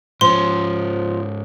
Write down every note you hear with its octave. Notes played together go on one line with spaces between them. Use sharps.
G#2 F3 C#4 C6